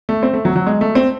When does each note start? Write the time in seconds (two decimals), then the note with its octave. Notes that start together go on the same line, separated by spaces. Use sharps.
0.09 A3
0.23 C4
0.34 A3
0.45 F#3
0.56 F#3
0.67 G#3
0.81 A3
0.95 C4